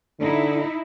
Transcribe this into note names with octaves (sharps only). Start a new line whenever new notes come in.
D3 D#4 E4